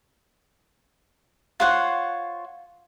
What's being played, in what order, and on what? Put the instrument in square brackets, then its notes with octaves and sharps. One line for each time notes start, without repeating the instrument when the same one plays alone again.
[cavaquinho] F4 C5 C#5 F#5